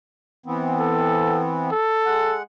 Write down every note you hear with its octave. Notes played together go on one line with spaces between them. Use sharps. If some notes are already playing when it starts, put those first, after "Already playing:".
E3 B3 C4
A4
A4
G#3 F#5